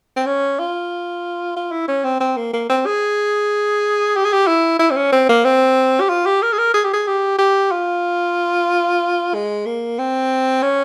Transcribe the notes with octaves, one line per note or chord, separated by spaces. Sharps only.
C4
C#4
F4
F4
E4
C#4
C4
C4
A#3
A#3
C4
G#4
G4
G#4
G4
E4
E4
C4
C#4
C4
A#3
C4
G4
F4
G4
A#4
G#4
A#4
G#4
G4
G#4
G4
G4
F4
G#3
A#3
C4
C#4